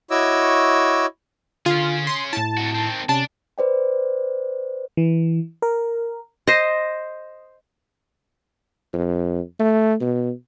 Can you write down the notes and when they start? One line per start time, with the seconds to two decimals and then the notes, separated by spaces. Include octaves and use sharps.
0.11 E4 F#4 C#5 D#5 D6 E6
1.66 D3 C#4 F4 G#4
2.07 C6
2.33 A2 E4 A5
2.57 C3 F#4
2.75 D#3 C4
3.09 C3 C#4 D4 A5
3.58 B4 C5 D5 G5
4.97 E3
5.62 A#4
6.47 C5 D#5
8.93 F2
9.60 A3
10.01 B2